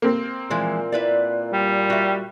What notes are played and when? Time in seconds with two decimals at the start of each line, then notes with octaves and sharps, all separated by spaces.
0.02 A#3 C4
0.50 A#2 E3 F3 G#3
0.92 E4 B4 D5
1.53 G3
1.90 F#4 E5